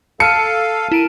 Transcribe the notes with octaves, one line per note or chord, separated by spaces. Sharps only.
A4 F5 A5 F6 C#7 D#7
E4 A#4 D7 D#7